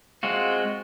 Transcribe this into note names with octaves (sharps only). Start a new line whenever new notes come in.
G#3 C4 F4 F#4